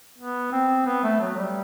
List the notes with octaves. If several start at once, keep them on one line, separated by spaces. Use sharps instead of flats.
B3
C4
B3
A3
F#3
G3